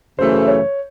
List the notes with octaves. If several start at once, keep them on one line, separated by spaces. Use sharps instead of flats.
F#2 C#3 E3 A3 C5
C#5